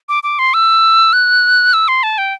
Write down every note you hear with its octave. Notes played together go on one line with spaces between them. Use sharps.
D6
D6
C6
E6
F#6
E6
C6
A5
G5